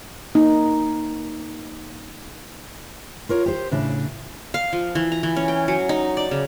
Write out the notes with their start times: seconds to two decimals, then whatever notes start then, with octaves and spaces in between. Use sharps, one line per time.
0.35 A#3 D#4
3.29 F4 A#4 C#5
3.46 G4 C5
3.71 A2 C#3 D4
4.54 F5
4.73 F3
4.95 E3
5.12 A#5
5.23 E3
5.36 C#4
5.48 G5
5.68 F#3
5.89 D#4
6.17 D5
6.31 C#3